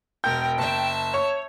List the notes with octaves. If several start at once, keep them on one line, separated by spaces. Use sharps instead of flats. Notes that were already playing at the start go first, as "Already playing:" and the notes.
E1 A#4 G5 G6
F#1 E5 A5
C#5 C#6